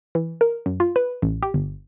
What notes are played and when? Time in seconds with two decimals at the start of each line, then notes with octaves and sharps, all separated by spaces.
0.15 E3
0.41 A#4
0.66 F#2
0.80 F4
0.96 B4
1.22 A1
1.43 G4
1.54 G1